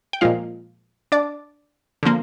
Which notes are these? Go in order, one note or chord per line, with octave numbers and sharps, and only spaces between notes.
G5
A#2 F3 G#3 F4 F5
D4 D5
D3 F3 A#3